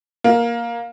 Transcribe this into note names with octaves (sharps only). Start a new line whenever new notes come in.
A#3